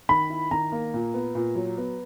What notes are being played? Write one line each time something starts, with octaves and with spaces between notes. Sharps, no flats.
D#3 B5
E4
D#3 A#5
A#3
A#2
B3
A#2
F#3
B3